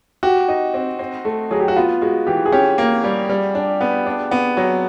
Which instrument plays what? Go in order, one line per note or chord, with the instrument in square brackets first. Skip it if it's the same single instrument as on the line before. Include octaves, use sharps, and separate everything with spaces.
[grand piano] F#4 [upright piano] G4
[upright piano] D#4
C4
C4
A3
[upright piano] F#3 [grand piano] G#4
[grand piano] G4
F#4
[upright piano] B3 [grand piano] F4
[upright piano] G#3 [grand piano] F#4
[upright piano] E3 [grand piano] G4
[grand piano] G#4
[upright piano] C#4 [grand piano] G4
[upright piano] A#3
G3
G3
D4
B3
D4
B3
F#3